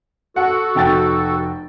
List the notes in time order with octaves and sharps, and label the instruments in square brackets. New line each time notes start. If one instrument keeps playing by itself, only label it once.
[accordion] F#4 A4 [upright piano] F#5
[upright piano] F1 G5 A6